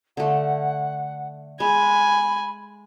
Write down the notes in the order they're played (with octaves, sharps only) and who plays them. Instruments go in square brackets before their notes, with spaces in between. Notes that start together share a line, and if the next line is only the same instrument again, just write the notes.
[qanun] D3 A3 [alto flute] F#5
[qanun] G#3 [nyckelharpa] G#5 [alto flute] B5